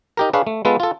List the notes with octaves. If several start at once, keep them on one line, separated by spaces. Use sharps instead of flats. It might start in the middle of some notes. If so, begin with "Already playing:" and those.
D#4 G4 A#4
D4 G#4 B4 C#5 F5
A3
G#3 B3 F4 A4 B4
F4 A4